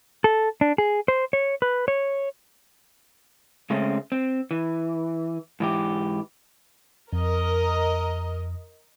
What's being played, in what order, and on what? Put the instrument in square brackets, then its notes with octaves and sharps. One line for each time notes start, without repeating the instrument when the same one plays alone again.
[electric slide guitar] A4
D4
G#4
C5
C#5
B4
C#5
C#3 G#3 A3 C4 C#4
C4
E3
G#2 E3 G4
[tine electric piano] F2 [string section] A#4 D#5